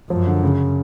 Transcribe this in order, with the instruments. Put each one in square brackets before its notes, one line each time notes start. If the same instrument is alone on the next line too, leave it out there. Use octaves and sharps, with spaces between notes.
[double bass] F#2 [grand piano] F3
[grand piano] D3
C#3